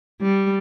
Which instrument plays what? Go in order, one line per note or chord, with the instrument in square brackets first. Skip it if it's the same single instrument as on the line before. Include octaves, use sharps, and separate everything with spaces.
[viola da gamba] G3